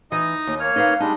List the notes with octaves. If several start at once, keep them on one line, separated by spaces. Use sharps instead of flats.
E3 D#4 D#5 D#6
D#2
A#3 C#5 F6
D#4 B4 F5
G3 G#3 D4 D#4